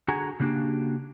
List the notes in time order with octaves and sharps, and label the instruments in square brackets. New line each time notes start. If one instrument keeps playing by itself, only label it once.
[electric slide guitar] D3 F#4 G#4 F#5 G#5 A#5
C#3 F#3 A#3 D4 F#4 G4